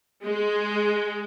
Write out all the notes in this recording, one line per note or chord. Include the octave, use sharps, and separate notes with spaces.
G#3